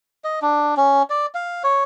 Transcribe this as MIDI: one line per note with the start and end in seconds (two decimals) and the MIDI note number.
0.24 0.39 75
0.42 0.75 62
0.77 1.03 61
1.10 1.26 74
1.35 1.63 77
1.64 1.84 73